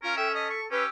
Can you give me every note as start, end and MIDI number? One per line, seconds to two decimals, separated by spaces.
0.03 0.52 61
0.03 0.16 65
0.03 0.16 70
0.17 0.69 69
0.17 0.31 76
0.17 0.28 79
0.35 0.46 75
0.35 0.59 95
0.50 0.65 85
0.71 0.86 61
0.71 0.88 67
0.71 0.83 71
0.71 0.89 88